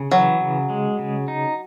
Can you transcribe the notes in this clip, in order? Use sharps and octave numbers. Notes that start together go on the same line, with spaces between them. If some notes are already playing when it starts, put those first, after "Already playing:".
Already playing: C#3
E3 F#3
C#3
G#3
C#3
D#4